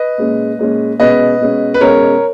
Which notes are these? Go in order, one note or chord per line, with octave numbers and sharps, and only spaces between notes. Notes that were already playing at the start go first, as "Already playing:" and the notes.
Already playing: B4 D#5
A#2 G#3 C#4
A#2 G#3 C#4
B2 G#3 C#4 B4 D#5
B2 G#3 C#4
B4
B2 G#3 C#4 A#4 C#5